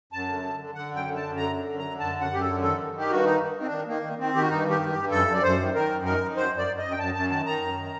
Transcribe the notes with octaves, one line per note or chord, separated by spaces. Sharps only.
F#2 A5
D3
D3
D3
D3 F#5
F#2
G5
D3
A5
F#2
D3 A#5
D3
F#2
D3 A#5
F#2 A5
F#2
F#5
F#2 G4
A4
D3
D#3 A4
D#3
D#3 G4
G2 F#4
D#3 D#4
D#3
D#3
C4
D4
D#3
D#3 A#3
D#3
D#3 C4
D#3 G4
F#4
G2 D#4
D#3
G4
G2
G2 G4
F#2 A4
F#2 D5
F#2 C5
D#3
D#3 A#4
F#2
D#3 A#4
D#3
F#2 C5
F#2
D5
F#2
D#5
F#2
G5
F#2 A5
F#2 A5
D#3 A5
D#3 A#5
F#2
D#3